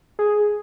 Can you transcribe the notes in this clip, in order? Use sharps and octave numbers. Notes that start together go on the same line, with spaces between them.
G#4